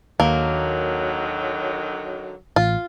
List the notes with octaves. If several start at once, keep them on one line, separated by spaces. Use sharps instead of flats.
D#2 D3 D#3 F#3 A#3
A1 F4